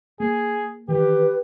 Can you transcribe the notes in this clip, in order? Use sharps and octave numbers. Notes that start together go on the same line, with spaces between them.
A#3 G#4
D#3 E3 G4 B4